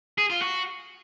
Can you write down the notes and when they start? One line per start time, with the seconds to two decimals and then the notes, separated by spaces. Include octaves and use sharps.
0.18 G#4
0.30 F4
0.41 F#4